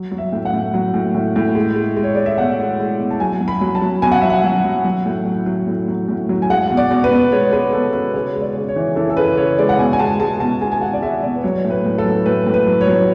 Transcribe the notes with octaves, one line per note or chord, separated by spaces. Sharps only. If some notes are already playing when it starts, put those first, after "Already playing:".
Already playing: F#3
F#3
E5
A2
F#5
A2
F#3
A2
A2
A2
G#3
G#3
G#3
C#5
G#3 D5
E5
B2 F#5
G#3
G#3
B2
A5
F#3 G#5
F#3
B5
F#3
A5
F#3
B2 G#5
F#5
F#3 E5
F#5
F#3
F#3
F#3
A2
F#3
F#3
A2
F#3
A2
F#3
G#5
G#3 F#5
B2
D5
B2
B4
B2
G#3 C#5
G#3 B4
B2 A4
B2 B4
C#3 C#5
G#3
D5
C#3
C#5
E3
E3 A4
A4
C#3 B4
C#3 C#5
G#3 D5
F#5
B2 G#5
G#5
G#3 A5
G#3 A5
B2 A5
G#3 G#5
G#5
G#3 F#5
D5
G#3 E5
B2 D5
B4
F#3 C#5
A2
B4
A2
A4
F#3
A2 B4
A2
B4
F#3
C#5
F#3